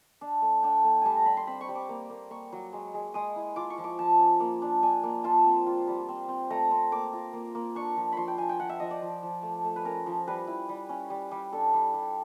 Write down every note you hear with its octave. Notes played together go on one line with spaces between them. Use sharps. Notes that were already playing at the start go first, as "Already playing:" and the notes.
D4
A3
D4 G5
A3
G3 G#5 A5
A#5
G3 B5
C6
C4 B5
C#6
G3
D6
A#3
A#3
A#3 C#6
F#3
G#3
G#3
G#3 D#6
E4
F4 D6
C#6
F3
D6
F3 A5
C#4
A#3
D4
D4 G#5
A#3
F4 A5
C4
F4
G3
C4
C4
A3 A#5
C4
A#3 D6
F4
A#3
A#3
D4 C#6
F3
F3 B5 C6
G5
F3 G#5
G5
F3 F#5
E5
F3 D#5
D5
F3
F3
A3
A3
B4
C#4 A#4
F3
G3 B4
E4
G3
C#4
G3
G3
D4 A4
G3
G3